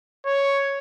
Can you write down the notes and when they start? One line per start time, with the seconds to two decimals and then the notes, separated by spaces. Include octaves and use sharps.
0.26 C#5